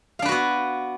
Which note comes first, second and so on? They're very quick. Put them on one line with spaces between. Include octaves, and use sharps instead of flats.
F5 D4 B4 F#4 B3